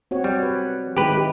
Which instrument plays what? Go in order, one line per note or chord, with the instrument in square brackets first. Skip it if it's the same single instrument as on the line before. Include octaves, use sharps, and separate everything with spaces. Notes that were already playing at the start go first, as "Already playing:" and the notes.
[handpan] C4 F#4 C#5
[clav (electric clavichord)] G3 [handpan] C#5
[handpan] B4
[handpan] D#3 G#3 E4 [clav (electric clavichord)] G4 B4